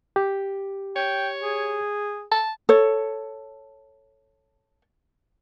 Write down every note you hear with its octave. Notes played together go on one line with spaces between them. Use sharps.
G4
C#5 G5
G#4
A5
A4 C#5